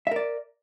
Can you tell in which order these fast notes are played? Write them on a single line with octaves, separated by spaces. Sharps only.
E5 A#4 D5